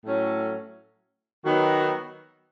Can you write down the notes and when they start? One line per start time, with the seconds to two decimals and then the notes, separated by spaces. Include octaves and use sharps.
0.05 A2 F#3 A3 C#4
1.45 D#3 F#3 B3 D#4 F#4